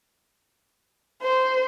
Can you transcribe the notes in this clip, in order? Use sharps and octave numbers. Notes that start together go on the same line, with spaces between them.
C5